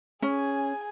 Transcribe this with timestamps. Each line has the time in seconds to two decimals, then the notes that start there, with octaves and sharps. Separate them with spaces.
0.22 C#4 G#4 G#5